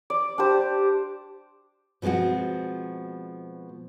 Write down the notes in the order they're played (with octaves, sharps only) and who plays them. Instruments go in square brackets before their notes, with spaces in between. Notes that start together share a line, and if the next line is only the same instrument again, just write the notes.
[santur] D5
D4 G4 C5
[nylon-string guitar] B2 F3 G#3 C4 F#4